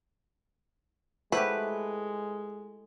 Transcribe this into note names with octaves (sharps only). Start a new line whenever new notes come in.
G#3 A3 E4 G4 B4 C5 E5 F#5